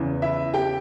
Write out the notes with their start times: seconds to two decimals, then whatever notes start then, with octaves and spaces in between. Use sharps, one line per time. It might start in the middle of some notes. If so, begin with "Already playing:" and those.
Already playing: E2 C#3 E3
0.22 E4 E5
0.54 G4 G5